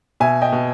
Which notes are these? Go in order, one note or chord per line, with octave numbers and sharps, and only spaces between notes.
B2 E5 G#5
D#5 G5
B2